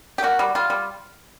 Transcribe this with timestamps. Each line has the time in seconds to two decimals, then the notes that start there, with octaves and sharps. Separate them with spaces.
0.18 G4
0.23 A#3 F#4
0.39 G3
0.55 G3 F4
0.70 G3